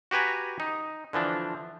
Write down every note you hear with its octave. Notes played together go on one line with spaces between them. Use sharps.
F#4 G4 B4 G#5 A#5
D#4
D3 E3 F3 D4